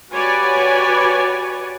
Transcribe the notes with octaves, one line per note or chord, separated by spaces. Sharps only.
F#4 G4 B4 C#5 D5 G#5